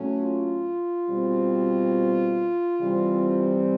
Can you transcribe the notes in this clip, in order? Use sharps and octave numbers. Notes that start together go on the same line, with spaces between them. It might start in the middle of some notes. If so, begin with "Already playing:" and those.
Already playing: A2 F#3 A3 C#4
F4
B2 G3 C4
C3 E3 G3 C4